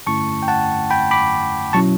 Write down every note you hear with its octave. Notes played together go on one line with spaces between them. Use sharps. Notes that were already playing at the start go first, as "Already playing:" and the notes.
G2 D3 A3 C#4 E4 A5 C#6
G5
F#5 A5
G5 B5
B5 D6
B2 F#3 C#4 E4 A5 C#6